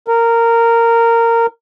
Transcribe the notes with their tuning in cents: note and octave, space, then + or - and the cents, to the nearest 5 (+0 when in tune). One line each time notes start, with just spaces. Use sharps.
A#4 -15